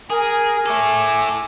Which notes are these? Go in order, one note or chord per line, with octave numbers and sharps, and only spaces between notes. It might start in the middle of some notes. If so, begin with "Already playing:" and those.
G#4 A#4 G#5
E4 A4 D6